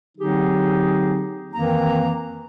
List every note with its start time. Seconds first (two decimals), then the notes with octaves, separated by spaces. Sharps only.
0.18 D3 F#3 C4 D#4 G4 G#4
1.52 F2 D#3 E3 A#3 C4 A#5